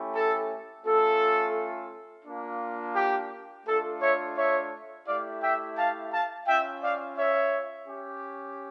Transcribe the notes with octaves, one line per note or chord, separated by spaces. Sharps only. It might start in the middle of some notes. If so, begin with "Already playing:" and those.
Already playing: A3 C#4 E4 G4
A4
A3 C#4 F4 A4
A#3 D4 F4
G4
A3 D4 F4 A4
C#5 E5
C#5 E5
A3 E4 G4 D5 F5
E5 G5
F5 A5
F5 A5
C#4 F4 E5 G5
D5 F5
C#5 E5
C#4 G4